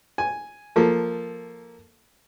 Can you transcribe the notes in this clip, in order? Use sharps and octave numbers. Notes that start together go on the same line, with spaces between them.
G#5
F3 A#3 A4